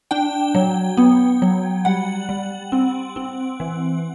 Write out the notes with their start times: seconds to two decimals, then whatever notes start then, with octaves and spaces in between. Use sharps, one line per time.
0.11 D4 G5
0.55 F#3
0.97 B3
1.42 F#3
1.85 G3 F#5
2.29 G3
2.72 C4
3.16 C4
3.60 E3